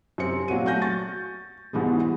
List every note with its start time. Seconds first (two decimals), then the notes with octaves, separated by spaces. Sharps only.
0.18 F#2 C3 C4 C5 C#7
0.48 A#2 F#3 F#4 D#7
0.65 A3 F#4 G#5 G6 A#6
0.82 C#6 A6
1.73 G#2 B2 E3 G3 G#3